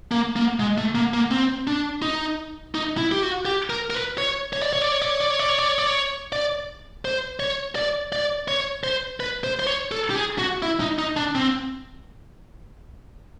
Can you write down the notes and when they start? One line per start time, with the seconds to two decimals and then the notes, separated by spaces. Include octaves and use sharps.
0.11 A#3
0.36 A#3
0.60 G#3
0.78 A3
0.95 A#3
1.14 A#3
1.31 C4
1.67 D4
2.02 D#4
2.75 D#4
2.98 E4
3.12 G4
3.23 F#4
3.45 G4
3.70 A#4
3.90 A#4
3.94 B4
4.18 C#5
4.53 C#5
4.62 D5
4.73 C#5
4.82 D5
4.92 C#5
5.02 D5
5.10 C#5
5.20 D5
5.30 C#5
5.40 D5
5.49 C#5
5.59 D5
5.68 C#5
5.78 D5
5.87 C#5
6.32 D5
7.05 C5
7.40 C#5
7.75 D5
8.13 D5
8.48 C#5
8.84 C5
9.20 B4
9.44 C5
9.60 C5
9.67 C#5
9.92 A4
10.10 G4
10.15 G#4
10.39 F#4
10.62 E4
10.80 D#4
10.99 D#4
11.17 D4
11.35 C4